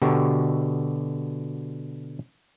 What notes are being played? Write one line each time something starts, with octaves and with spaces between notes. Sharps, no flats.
B2 D3 F#4 G4